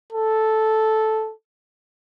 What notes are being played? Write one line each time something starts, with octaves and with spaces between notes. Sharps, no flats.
A4